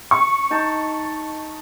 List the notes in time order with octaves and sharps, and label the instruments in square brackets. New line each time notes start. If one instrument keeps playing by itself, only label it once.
[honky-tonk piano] C#6
[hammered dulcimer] D#4 A5